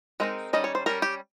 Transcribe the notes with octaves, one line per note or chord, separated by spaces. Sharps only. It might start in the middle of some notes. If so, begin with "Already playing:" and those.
G#3 C4 D#4 A#4
D#3 G3 C#4 D#5
C#5
C5
G3 C#4 A#4
G4